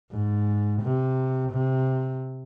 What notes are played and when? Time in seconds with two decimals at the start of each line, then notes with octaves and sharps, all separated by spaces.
0.12 G#2
0.82 C3
1.52 C3